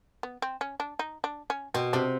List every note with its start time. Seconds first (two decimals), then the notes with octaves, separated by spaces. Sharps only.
0.23 B3
0.42 C4
0.61 C#4
0.80 D4
0.99 D#4
1.24 D4
1.50 C#4
1.74 B2 C4
1.93 C3 D4